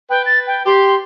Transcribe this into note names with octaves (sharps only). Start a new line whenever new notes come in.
B4 G5
A6
G5
G4 C6